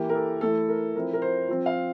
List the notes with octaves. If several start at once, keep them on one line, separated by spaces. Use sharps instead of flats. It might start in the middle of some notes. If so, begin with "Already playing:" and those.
Already playing: E3 A#3 E4 G4
A#4
A4
E3 A3 E4 A4
A#4
F3 C4 E4 A#4
A#4
C5
F3 C4 F4
F5